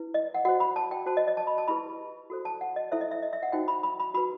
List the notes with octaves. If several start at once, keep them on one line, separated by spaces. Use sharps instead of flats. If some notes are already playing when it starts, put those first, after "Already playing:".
Already playing: E4 B4
D#5
F#5
F#4 C5 F#5
B5
A5
G5
F#4 C5 A5
D#5
D#5
A5
B5
A5
E4 G4 B4 B5
F#4 A4 C5
A5
F#5
D#5
E4 A4 C5 E5
D#5
E5
D#5
E5
F#5
D#4 F#4 C5 G5
B5
B5
B5
F#4 B4 B5